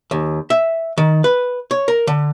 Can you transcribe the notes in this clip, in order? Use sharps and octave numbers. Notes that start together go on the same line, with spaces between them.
D#2
E5
D#3
B4
C#5
A#4
D3